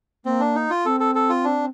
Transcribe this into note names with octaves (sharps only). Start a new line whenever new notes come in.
A#3 C4
D4
D#4
F4
C4 A4
A4
A4
F4
D4